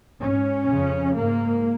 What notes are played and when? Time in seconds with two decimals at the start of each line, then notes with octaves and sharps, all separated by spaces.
0.19 G#2 C#4
0.67 F2 C#3
1.15 G#2 A#3